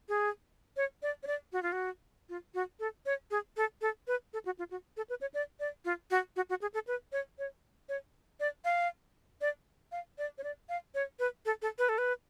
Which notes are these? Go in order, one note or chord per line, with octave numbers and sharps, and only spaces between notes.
G#4
C#5
D5
C#5
D5
F#4
F4
F#4
F4
F#4
A4
C#5
G#4
A4
A4
B4
A4
F#4
F4
F#4
A4
B4
C#5
D5
D5
F4
F#4
F#4
F#4
G#4
A4
B4
C#5
C#5
C#5
D5
F5
D5
F5
D5
C#5
D5
F5
C#5
B4
A4
A4
B4
A4
B4